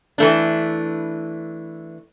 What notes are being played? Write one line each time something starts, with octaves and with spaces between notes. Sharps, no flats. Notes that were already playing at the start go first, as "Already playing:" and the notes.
E3 A3 D4